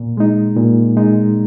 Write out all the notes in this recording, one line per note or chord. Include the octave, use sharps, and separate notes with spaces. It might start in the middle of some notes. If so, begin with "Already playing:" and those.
Already playing: A#2
G#3 D#4
A#2
G#3 D#4